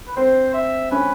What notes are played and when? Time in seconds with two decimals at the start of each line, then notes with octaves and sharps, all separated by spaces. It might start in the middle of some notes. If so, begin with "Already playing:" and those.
0.07 B4
0.17 C4 C5
0.54 E5
0.92 C#4 B4